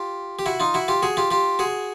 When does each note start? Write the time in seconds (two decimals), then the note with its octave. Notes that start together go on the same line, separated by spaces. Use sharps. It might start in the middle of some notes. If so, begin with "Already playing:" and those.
Already playing: F4 G4
0.39 G4
0.46 E4 F#4
0.60 D#4 F4
0.74 E4 F#4
0.88 F4 G4
1.03 F#4 G#4
1.17 F4 G4
1.31 F4 G4
1.59 F#4 G#4